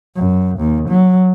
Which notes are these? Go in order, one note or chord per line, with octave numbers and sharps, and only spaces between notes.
F#2
D#2
F#3